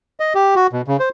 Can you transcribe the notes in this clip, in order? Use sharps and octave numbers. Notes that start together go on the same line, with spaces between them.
D#5
G4
F#4
B2
C#3
C5